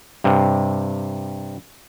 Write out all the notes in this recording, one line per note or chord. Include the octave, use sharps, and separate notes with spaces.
G2 C3